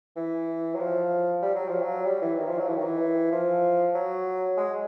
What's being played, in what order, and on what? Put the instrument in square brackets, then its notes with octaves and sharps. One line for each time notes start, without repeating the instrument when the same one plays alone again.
[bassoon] E3
F#3
F3
G3
F#3
F3
F#3
G3
E3
D#3
F3
F#3
E3
D#3
E3
F3
F#3
G#3